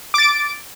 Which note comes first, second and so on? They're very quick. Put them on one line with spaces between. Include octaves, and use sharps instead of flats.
D6 A6 D7